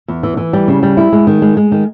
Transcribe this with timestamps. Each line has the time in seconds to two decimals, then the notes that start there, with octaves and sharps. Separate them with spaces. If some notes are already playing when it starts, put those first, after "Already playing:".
0.08 E2
0.23 E3
0.37 E3
0.53 G3
0.68 C#3
0.83 G3
0.97 E4
1.13 G#3
1.27 D#3
1.42 G#3
1.57 G#3
1.72 D#3